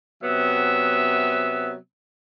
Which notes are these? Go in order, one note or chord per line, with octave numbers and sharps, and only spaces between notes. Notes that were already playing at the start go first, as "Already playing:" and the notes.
C3 F#3 B3 E5